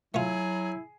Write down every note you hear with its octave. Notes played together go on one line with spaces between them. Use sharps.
F#3 A3 E4 F4 G#4